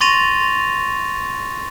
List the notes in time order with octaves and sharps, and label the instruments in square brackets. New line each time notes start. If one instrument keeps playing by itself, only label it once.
[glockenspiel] C6 C#6 A6 A#6 D#7 F7